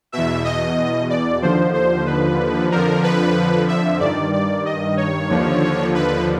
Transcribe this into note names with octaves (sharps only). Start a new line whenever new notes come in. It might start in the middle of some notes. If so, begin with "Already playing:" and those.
E2 B2 E5
D#5
D5
D#2 D3 F3 C5
C5
B4
F2 D3 F3 A#4
B4
E5
G2 D#3 D5
D5
D#5
C#5
D#2 D3 F3
B4